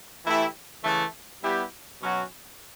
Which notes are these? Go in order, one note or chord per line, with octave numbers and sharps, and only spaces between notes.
E3 A3 E4 G4
C#3 E3 A3
G3 B3 E4 G4
B2 F#3 C#4 F#4